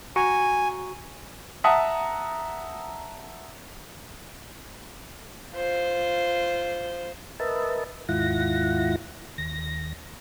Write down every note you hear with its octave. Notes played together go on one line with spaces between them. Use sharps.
F#4 G#5 A#5 C#6
E5 F#5 A5 A#5 D#6
F4 C5
A#4 B4 D#5 E5 A5
D#2 G#2 E4 F4 F#5 A#6
D#2 A#6